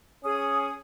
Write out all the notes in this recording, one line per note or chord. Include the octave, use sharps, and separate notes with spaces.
C#4 G#4 D#6